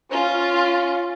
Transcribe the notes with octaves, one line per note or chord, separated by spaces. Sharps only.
C#4 F4